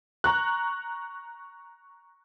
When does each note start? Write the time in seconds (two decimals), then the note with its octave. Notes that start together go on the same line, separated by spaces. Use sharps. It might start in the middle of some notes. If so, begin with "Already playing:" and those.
0.24 A#5 C#6 F#6